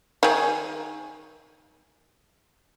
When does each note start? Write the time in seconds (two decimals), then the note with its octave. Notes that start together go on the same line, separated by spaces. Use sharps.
0.23 D#3 G#4